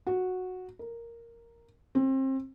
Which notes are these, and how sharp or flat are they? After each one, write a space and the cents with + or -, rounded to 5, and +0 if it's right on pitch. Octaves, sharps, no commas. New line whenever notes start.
F#4 -10
A#4 -5
C4 +30